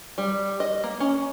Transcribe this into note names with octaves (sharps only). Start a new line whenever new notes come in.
G3
D#5
A#3
C#4